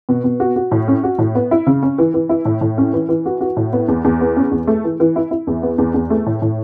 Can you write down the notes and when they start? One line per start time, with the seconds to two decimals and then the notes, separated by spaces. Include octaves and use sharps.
0.09 B2
0.24 B2
0.40 F#4
0.56 F#4
0.71 A2
0.88 C#4
1.04 F#4
1.18 A2
1.35 B3
1.51 E4
1.67 C#3
1.83 C#4
1.98 E3
2.14 E3
2.29 E4
2.45 A2
2.61 A2
2.78 C#4
2.93 E3
3.09 E3
3.26 F#4
3.41 F#4
3.57 A2
3.73 B3
3.88 E2
4.04 E2
4.21 B3
4.36 C#4
4.51 E2
4.67 A3
4.84 E3
5.00 E3
5.16 E4
5.31 E4
5.47 E2
5.63 B3
5.78 E2
5.94 E2
6.10 A3
6.26 A2
6.42 A2